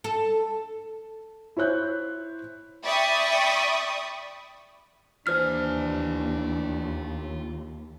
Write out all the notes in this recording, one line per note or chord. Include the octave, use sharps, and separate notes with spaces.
A4
E4 C5 C#5 F#6 G6
D5 E5 G5 B5 C#6 D#6
D#2 E3 D4 F4 C5 G#5 F6